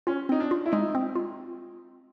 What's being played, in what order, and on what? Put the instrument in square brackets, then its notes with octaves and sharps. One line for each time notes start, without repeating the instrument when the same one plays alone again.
[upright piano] C#4 [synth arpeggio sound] F4
[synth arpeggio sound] C4 [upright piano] D#4
[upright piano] D4
[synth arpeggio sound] F4
[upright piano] E4
[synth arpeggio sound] G#3 [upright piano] D#4
[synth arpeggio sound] C4
F4